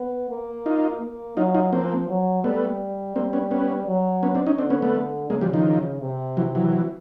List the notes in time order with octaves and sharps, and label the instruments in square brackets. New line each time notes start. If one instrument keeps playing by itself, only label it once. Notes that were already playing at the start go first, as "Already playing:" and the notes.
Already playing: [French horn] B3
A#3
[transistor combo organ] D#4 F4
[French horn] A#3
[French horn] F#3 [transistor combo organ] D#4 F4
[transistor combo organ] D#4 F4
[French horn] F3 [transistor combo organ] A#3 C4
[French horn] F#3
[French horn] G3 [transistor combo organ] A3 B3
[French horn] G3 [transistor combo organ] A#3 C4
[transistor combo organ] B3 C#4
B3 C#4
[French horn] F#3
[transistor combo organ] B3 C#4
C4 D4
C#4 D#4
[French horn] D3 [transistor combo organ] C4 D4
[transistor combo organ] B3 C#4
A3 B3
[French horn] C#3 [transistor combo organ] G#3 A#3
[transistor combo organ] F3 G3
D#3 F3
[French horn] C3
[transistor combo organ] E3 F#3
E3 F#3